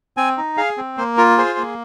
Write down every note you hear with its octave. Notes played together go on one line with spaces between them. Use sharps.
C4 G#5
D#4
G#4 F5
C4
A#3 C5
F4 A#4
G#4 C5
A#3